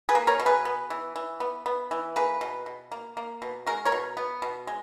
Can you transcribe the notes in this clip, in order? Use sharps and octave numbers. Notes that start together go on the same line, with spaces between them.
G#4 B4
A#3
A#4 C#5
B2
G#4 B4
B3
E3
E3
B3
B3
E3
A#3 G#4 B4
B2
B2
A#3
A#3
B2
G#3 F#4 A#4
A#4 C#5
B2
B3
B2
G#3